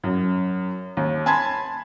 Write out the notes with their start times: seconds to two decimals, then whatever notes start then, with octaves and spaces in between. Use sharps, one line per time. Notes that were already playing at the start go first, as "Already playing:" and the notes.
0.04 F#2
0.97 D#2
1.26 G#5 A5 B5 C6 G#6